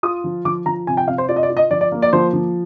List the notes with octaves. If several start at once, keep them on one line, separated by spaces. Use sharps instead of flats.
F4 D#6
F3
F3 D6
F3 A#5
C3 G#5
G5
C3 F5
C5
F4 D5
D#5
D5
F4
D#5
F3 D5
D5
A#3
D5
F3 C5
F3